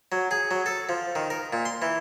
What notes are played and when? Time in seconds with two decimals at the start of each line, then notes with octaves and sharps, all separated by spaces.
0.12 F#3
0.31 G#4
0.51 F#3
0.66 A4
0.89 F3
1.15 D#3
1.30 A#4
1.53 A#2
1.65 C6
1.82 E3